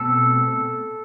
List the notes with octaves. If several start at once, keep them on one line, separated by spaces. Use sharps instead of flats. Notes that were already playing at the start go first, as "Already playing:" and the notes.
Already playing: B2 A3 C4 A4